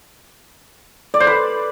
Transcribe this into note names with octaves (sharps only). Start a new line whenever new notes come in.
D5
C5
B4